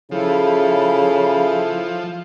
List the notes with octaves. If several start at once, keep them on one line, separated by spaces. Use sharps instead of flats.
C#3 F3 E4 A4